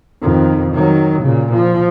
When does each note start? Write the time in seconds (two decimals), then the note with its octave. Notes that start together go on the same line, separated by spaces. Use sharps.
0.22 F2 D#3
0.74 D#3 F#3
1.22 A#2 C#3
1.53 F3